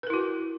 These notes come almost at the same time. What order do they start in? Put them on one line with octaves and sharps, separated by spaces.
B4 A#4 E4 F#4